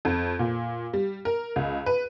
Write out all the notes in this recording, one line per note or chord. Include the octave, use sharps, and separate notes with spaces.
F2
A#2
G3
A#4
C#2
B4